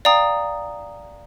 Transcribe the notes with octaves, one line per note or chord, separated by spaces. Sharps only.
D5 F5 G5 A#5 D#6